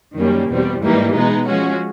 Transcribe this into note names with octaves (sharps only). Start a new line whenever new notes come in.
F#2 D#3 G3 A#3 C#4
E2 B2 G3 C4
G#2 E3 G3 A#3 D#4
B2 G#3 B3 D#4
F3 G#3 C#4 F#4